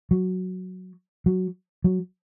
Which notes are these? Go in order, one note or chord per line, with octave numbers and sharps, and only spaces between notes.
F#3
F#3
F#3